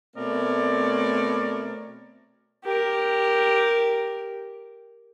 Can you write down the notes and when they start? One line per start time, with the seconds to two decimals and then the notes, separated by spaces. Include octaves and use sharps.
0.16 B2 A3 C4 A#4 C#5 D5
2.64 G4 A#4